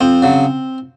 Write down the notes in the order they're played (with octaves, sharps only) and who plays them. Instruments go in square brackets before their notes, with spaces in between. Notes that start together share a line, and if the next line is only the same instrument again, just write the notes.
[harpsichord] F2 C4
C#3 F#3